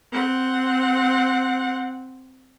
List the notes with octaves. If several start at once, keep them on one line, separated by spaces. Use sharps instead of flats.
C4 F#5